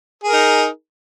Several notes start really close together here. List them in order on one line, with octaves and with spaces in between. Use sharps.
G#4 A#4 D#4